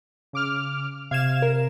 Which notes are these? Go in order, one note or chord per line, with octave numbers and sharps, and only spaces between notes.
C#3 D6 F6
C3 F5 G#6 E7
A#4